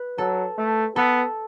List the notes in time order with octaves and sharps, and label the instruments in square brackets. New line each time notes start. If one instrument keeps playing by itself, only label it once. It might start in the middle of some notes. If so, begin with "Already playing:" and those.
Already playing: [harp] B4
[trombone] F#3 [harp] A4
[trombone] A3
[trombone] B3 [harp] A4